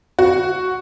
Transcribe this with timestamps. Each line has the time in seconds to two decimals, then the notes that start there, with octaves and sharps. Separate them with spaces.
0.19 F#4